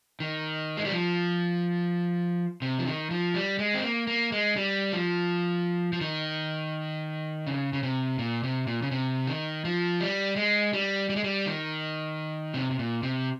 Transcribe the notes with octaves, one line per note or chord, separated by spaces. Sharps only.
D#3
G#3
G3
F3
C3
F3
D#3
F3
G3
G#3
C4
A#3
A#3
G#3
G3
F3
F3
D#3
C#3
C#3
C3
A#2
C3
A#2
C#3
C3
D#3
F3
G3
G#3
G3
G3
G#3
G3
D#3
C3
C3
A#2
C3